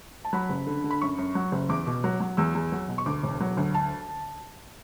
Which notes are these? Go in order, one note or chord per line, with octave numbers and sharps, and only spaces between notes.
A5
F#3 B5
F#1
D3
D3
B5
F#2 C#6
F#2
F#3
F#1
E2 D6
B2
F#3
F#3
E2 E6
E2
F#3
B2
C#6
D2 D6
E1
F#3
D2
A5